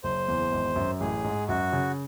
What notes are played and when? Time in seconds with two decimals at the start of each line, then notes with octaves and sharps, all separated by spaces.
0.04 F#1 C5
0.28 E2
0.52 G#1
0.76 F#2
1.00 A1 G#4
1.24 G#2
1.48 F#2 F#4
1.73 C#3